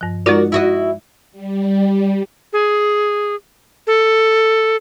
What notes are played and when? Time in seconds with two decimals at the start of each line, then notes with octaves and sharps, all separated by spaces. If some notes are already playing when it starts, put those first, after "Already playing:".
0.01 G2 F3
0.26 G#3 D#4 F4 F#4 A#4 D5
0.52 E4 F#4 D#5
1.32 G3
2.53 G#4
3.87 A4